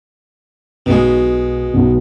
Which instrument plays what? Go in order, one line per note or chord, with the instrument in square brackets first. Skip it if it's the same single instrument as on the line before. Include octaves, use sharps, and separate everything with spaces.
[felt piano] B1 [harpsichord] B2 G#3
[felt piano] B1